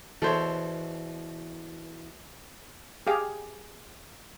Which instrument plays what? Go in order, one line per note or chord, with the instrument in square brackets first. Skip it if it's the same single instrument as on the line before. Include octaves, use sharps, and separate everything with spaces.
[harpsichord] E2 B2 [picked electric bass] E3 [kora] A4 C5 C#5
[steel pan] G4 G#4 F5